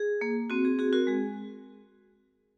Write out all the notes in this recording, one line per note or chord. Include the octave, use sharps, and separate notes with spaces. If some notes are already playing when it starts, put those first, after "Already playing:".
Already playing: G#4
A#3
C4 F#4
G#4
F#4 G#4
F#4 A#4
G#3 G#4